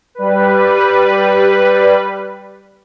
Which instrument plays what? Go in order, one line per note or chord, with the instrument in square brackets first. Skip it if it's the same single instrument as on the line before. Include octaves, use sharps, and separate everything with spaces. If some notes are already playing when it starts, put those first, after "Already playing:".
[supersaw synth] G3 B4